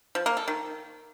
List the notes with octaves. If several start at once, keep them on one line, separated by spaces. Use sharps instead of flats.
F3
A#3
A4
D#3